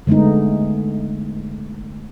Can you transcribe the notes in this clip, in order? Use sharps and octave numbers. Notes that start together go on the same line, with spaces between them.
D3 G#3 A3 B3 D#4